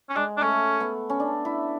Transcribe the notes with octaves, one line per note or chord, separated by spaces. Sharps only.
C#4
G#3 D4
D4
A3 C#4
B3
C#4
D4
E4